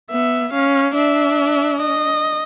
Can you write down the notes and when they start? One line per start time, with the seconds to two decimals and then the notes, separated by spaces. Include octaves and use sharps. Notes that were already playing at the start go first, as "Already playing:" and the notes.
0.10 B3 E5
0.53 C#4 F5
0.95 D4 E5
1.78 D#5